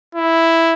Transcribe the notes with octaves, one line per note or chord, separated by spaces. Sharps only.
E4